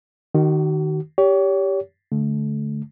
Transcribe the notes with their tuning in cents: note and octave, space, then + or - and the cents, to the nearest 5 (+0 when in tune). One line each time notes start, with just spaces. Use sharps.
D#3 -15 F#4 +35
G4 +0 C#5 +35
D3 -25 A3 -30